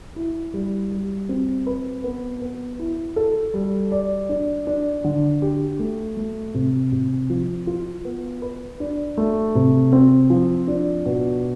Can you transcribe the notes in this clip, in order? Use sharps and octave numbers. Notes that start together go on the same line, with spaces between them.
E4
G3
G3
C4
B4
B3
B3
E4
A4
G3
D5
D4
D4
D3
G4
A3
A3
C3
C3
F3
F4
B3
B4
D4
A3
C3
C4
F3
D4
B2